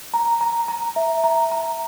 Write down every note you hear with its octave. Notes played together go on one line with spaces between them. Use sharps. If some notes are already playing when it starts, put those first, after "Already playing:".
A#5
A#5
A#5
E5
A#5
A#5